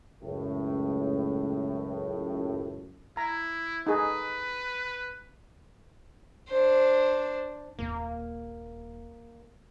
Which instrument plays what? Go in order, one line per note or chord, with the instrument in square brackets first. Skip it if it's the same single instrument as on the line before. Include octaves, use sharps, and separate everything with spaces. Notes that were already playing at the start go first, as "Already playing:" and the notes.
[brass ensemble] C#2 F#2 A2
[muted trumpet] E4 [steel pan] A#5
[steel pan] D#4 G#4 A4 [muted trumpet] B4
[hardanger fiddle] D4 C5
[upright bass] D#1 [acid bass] A#3